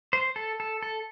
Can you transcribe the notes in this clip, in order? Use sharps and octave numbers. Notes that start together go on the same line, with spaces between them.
C5
A4
A4
A4